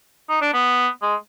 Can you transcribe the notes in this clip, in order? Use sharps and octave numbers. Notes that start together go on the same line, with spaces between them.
D#4
D4
B3
G#3